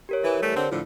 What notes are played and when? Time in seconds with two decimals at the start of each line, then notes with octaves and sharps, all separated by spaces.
0.09 G4 A#4 C#5
0.24 E3
0.41 E3 G3 A3
0.55 D3 C4
0.70 A2 D3 F3